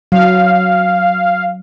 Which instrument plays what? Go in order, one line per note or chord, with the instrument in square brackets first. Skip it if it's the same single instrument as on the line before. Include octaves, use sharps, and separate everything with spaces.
[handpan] F#3 [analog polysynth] F5